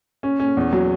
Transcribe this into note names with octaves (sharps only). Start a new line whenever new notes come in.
C#4
C#4
E2
F#3